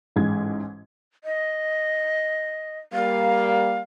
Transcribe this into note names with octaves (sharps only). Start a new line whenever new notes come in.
A1 G#2 G#3 G#6
D#5
G3 A#3 F5